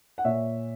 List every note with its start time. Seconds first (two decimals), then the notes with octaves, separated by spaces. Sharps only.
0.18 F#5
0.25 A#2 C#5 E5